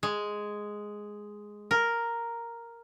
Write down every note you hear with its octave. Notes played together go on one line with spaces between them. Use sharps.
G#3
A#4